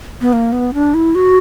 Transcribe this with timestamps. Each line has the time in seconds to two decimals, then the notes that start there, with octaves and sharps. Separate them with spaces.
0.21 B3
0.33 A#3
0.52 B3
0.74 D4
0.94 E4
1.15 F#4